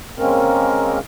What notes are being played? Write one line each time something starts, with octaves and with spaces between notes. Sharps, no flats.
C#3 G#3 A#3 C4 C#4 A#4